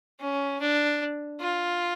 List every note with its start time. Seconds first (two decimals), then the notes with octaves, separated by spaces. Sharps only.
0.20 C#4
0.61 D4
1.40 F4